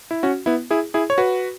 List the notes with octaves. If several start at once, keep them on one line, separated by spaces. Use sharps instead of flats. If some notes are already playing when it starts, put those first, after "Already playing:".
E4
C#4 F#4
B3 E4
E4 G#4
E4 G#4
C#5
F#4 B4